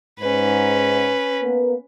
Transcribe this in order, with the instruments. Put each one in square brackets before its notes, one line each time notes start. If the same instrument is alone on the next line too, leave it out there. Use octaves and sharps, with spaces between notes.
[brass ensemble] G#2 [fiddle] C#4 B4
[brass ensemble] A#3 B3 B4